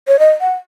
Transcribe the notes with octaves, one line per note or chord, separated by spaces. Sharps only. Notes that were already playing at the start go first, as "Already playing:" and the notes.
C#5
D#5
F#5